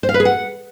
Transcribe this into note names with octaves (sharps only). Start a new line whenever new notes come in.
C5
F5
B4
G#4
F#5